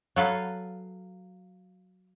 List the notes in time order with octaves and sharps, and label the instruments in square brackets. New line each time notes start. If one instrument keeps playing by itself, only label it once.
[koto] F#3 A4 B4 [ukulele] F5